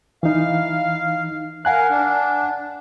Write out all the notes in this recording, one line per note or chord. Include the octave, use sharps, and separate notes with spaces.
E3 D#4 F5
A#4 F5 F#5 G#5 F#6
D4